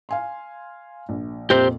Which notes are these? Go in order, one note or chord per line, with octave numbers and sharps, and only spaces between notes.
F5 G#5 C6
A#1
F2 A#2 G4 C5